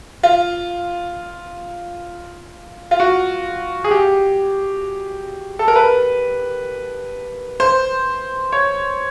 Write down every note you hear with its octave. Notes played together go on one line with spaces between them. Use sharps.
F4
F4
F#4
G#4
G4
A4
A#4
B4
C5
C#5